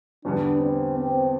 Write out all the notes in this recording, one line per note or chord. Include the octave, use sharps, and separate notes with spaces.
E2 D3 G3 B3 D4
C4
C4